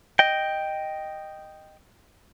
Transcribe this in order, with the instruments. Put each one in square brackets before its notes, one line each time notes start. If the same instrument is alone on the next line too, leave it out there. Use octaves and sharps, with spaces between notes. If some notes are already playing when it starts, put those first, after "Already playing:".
[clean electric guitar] D#5 G5